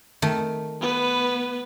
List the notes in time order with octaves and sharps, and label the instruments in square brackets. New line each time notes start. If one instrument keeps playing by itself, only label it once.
[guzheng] D#3 A3
[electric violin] B3 B4